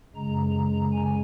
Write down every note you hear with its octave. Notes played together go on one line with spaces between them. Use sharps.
F#2 C#3 G#3 A#5
G#5